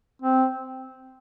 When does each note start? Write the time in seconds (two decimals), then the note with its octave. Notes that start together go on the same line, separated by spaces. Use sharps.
0.22 C4